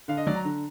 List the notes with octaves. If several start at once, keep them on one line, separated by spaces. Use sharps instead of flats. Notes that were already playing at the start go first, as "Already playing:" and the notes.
D3 F5
D#5
F#3 D5
A#5
D3